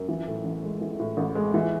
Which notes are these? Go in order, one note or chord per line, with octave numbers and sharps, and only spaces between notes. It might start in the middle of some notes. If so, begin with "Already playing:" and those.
Already playing: F#2
E3
A2
A1
G#3
E3
A2
A1
G#3
E3